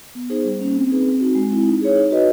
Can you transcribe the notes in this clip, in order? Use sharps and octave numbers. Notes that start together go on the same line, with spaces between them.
B3
D#4 G#4 C5
G3
A#3 C#4
C4
D#4 G#4 B4
C4
D#4 F#4
G#3
C4 E4
D#4
G#4 C#5
D#4
F#4 B4 D#5